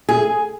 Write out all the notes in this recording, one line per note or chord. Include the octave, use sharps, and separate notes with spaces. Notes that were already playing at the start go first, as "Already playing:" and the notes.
G#4